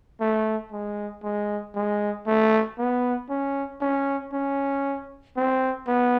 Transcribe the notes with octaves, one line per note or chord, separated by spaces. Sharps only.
A3
G#3
G#3
G#3
A3
B3
C#4
C#4
C#4
C4
B3